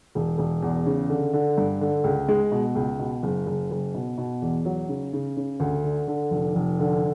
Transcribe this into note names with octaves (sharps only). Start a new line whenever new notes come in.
E1
E1
E2
C#3
D3
D3
G2
D3
C#2
G#3
B2
C#2
B2
F#1
F#1
F#1
B2
B2
E2
F#3
C#3
C#3
C#3
D2
D3
D3
F1
F1
D3